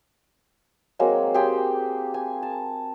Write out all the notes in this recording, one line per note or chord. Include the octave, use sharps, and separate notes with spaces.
F#3 G#3 A#3 C4
G4 G#4 G5 C6
G#5
A5